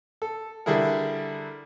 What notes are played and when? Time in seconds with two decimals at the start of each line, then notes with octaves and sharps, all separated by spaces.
0.22 A4
0.66 D3 G3 D4 E4 G#4 A#4